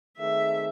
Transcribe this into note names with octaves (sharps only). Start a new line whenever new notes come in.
D#3 A3 C4 D#4 G#4 E5